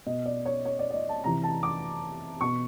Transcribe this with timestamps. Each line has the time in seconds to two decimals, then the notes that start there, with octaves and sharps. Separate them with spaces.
0.06 B2 D#5
0.26 D5
0.45 C#5
0.65 C#5
0.79 D5
0.90 D5
0.94 D#5
1.09 A5
1.24 C3 E3 A#5
1.43 A5
1.63 D6
2.41 B2 C#6